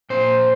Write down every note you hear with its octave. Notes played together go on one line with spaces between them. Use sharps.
A#2 C5